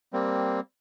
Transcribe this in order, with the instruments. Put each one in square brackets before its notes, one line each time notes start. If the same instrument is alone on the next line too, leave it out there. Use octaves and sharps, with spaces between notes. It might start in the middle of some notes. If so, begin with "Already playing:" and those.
[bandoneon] G3 A#3 C4